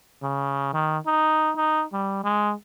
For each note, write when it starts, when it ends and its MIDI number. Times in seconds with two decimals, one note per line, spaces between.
0.22 0.70 49
0.74 0.98 51
1.06 1.51 63
1.56 1.84 63
1.93 2.23 55
2.24 2.54 56